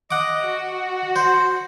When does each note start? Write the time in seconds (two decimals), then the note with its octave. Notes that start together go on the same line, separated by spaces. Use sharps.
0.11 D#5 F#5 D6
0.44 F#4
1.16 C5